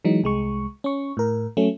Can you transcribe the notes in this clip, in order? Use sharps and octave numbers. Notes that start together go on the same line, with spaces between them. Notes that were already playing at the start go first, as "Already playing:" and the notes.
E3 F#3 G#3 D#4
C2 G#3 C#6
C#4 C#6
A2 A#4
F#3 A3 C#4